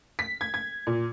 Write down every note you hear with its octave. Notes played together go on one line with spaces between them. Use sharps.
B6
G#6
G#6
A#2